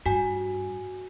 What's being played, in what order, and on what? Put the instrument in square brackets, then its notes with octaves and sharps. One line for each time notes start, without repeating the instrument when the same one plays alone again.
[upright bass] G2 [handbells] F#4 G#5